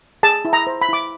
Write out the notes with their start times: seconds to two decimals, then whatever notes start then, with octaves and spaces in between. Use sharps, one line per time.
0.23 G#4 A5
0.45 E4
0.53 A#5
0.67 C5
0.82 B5
0.89 E4 D6